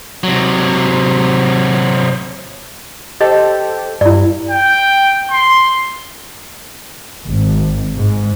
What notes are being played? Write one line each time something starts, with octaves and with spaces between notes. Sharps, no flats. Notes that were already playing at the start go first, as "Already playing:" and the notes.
C3 F#3
G4 A4 C5 D#5
G2 E4 D5
G5
C6
G#1
G#2